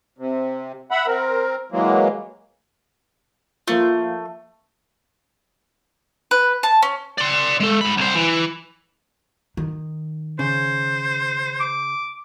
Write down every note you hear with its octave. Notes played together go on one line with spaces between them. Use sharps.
C3
E5 F#5 B5
C4 A#4
E3 F#3 G#3 A#3
F3 A3 A#3 F4
B4
A5
C#4
D5 C6
G#3 A4
G#2 B5
C2 C5
E3
D#3
C#3 C5
D6